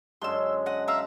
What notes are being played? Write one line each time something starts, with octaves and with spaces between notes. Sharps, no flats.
F#2 D3 G#3 C6 E6
D#5 F#5
A#4 E5 F5